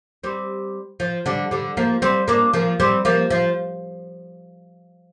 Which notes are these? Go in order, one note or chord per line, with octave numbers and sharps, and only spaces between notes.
G3 C4
F3
D3 G3
D3 G3
F3 A#3
G3 C4
A#3 D4
F3 A#3
G3 C4
F3 A#3
F3